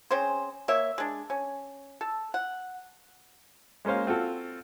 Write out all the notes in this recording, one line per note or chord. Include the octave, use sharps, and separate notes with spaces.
C4 C#4 G#4 C5
A#3 C#5 E5
G#3 D4
C#4
A4
F#5
G#3 A#3 C#4 C5 F5
C4 F4 F#4 A4